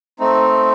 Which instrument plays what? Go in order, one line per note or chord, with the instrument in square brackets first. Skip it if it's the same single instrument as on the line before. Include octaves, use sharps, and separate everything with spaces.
[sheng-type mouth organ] A3 C4 D#4